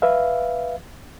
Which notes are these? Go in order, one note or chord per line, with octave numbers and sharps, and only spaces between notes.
B4 E5 F5